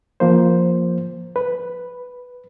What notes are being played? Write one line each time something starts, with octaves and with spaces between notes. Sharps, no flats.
F3 A#3 C5
B4